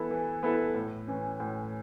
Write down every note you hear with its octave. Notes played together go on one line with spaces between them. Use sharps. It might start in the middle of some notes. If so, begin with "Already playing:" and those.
Already playing: E3 B3 E4 A4
E3
B3 E4 A4
A2
E3 C#4
A2